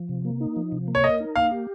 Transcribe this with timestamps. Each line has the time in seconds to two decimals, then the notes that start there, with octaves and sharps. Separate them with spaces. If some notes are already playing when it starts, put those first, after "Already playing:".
Already playing: F3
0.09 C3
0.25 A#3
0.41 D#4
0.56 F3
0.72 C3
0.88 A#3
0.95 C#5
1.04 A#4 D#5
1.20 D#4
1.36 A#3 F5
1.51 G4